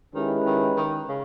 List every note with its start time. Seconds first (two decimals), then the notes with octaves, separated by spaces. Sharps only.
0.15 D#3 G#3 C#4 E4 G4 B4
0.46 D#3
0.77 D#3
1.09 C#3